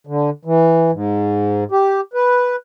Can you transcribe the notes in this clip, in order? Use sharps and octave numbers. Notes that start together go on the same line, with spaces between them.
D3
E3
G#2
G4
B4